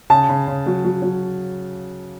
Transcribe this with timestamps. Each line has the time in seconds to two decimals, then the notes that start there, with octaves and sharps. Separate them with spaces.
0.10 C#3 A5
0.29 C#3
0.47 C#3
0.66 F#3
0.84 F#3
1.02 F#3